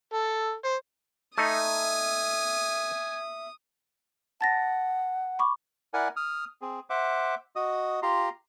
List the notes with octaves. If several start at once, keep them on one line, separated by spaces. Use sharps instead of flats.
A4
C5
A3 D#4 E5 G#5 D#6
F#5 A5 A6 A#6
B5 C#6 D6
E4 A#4 D5 F#5 G#5
D#6 F6
C4 G#4
C5 E5 F#5 D6
F#4 D#5 D#6
F4 G4 A#5 C6